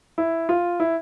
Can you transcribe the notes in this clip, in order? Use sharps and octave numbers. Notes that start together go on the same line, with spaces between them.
E4
F4
E4